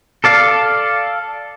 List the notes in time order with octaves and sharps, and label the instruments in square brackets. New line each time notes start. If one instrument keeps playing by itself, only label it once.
[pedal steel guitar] A4 D5 F5